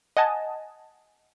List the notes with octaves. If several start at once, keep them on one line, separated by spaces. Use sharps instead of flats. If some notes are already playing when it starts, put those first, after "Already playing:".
D#5 F#5 G#5 A5